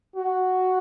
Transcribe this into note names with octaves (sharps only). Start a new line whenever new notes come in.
F#4